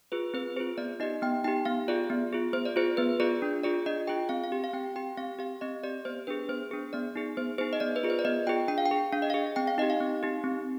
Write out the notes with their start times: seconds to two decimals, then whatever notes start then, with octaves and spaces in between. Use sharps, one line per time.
0.12 F4 G#4 B4
0.34 C4 B4
0.56 F4 G#4 C5
0.78 B3 D5
1.00 D#4 G4 D#5
1.22 B3 G5
1.44 D#4 G4 G5
1.65 B3 F5
1.88 F4 G#4 D5
2.10 B3
2.33 F4 G#4
2.53 B3 C5
2.65 D5
2.76 F4 G#4 C5
2.97 B3 B4
3.20 F4 G#4 D5
3.42 D4
3.63 F4 G#4 D5
3.86 D4 D#5
4.07 F4 G#4 G5
4.29 C4 F5
4.44 F5
4.52 G4
4.64 F5
4.73 C4 G5
4.96 G4 G5
5.17 C4 F5
5.39 G4 F5
5.61 C4 D#5
5.83 G4 D5
6.05 B3 C5
6.27 D4 G#4 B4
6.49 B3 C5
6.71 D4 G#4
6.93 B3 D5
7.16 D#4 G#4
7.37 B3 C5
7.58 D#4 G#4 C5
7.73 D#5
7.80 B3 D5
7.96 B4
8.03 F4 G#4
8.10 C5
8.19 D5
8.25 B3 D#5
8.47 F4 G#4 G5
8.68 D4 G5
8.78 F5
8.86 G5
8.91 G#4
9.13 D4 F5
9.22 D#5
9.30 G#4 F5
9.56 C4 G5
9.67 F5
9.78 D#4 D#5
9.82 G4
9.90 F5
10.01 C4
10.23 D#4 G4
10.44 C4